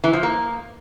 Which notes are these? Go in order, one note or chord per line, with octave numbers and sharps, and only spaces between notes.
E3
F3
A#3